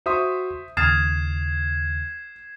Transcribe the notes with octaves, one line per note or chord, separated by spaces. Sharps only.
F#4 C5 E5 C6 C#6 D#6
D#2 C#3 D#6 F6 G#6 A6 C7 E7